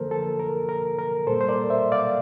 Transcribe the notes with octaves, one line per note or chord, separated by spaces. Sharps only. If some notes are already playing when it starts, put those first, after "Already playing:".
Already playing: D3 F3 A#3 A4 A#4 C5
A4
A#4
A#4
A#4
A#2 G3 A#3 A4 C5
C5
A#4 D5
C5 E5
D5 F5